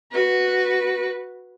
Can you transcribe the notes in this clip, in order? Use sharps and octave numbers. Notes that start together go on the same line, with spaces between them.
F#4 B4